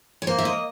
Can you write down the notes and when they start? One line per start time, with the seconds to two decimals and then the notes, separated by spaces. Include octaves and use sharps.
0.22 C#5
0.27 A#3 C5
0.38 E5
0.45 D#5